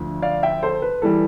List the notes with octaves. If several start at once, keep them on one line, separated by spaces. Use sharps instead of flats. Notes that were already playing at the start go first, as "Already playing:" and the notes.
Already playing: D2 D3 F3
D5 F5
E5 G5
A4 C5
B4
E3 G3 A4